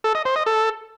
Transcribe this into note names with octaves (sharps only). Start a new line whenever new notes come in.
A4
D#5
C5
D#5
A4